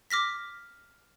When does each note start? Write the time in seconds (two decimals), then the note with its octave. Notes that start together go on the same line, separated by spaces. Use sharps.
0.10 D6 F6 A#6 B6